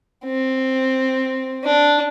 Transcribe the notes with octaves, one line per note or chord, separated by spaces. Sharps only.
C4
D4